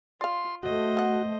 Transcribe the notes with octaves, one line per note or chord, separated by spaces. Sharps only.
F4 D5 F5 C6
A3 F#4 C5 D#5
B3 F#5